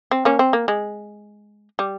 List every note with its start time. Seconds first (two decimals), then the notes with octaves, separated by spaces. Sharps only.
0.11 C4
0.25 A#3 C#4
0.39 C4
0.53 A#3
0.68 G#3
1.79 G3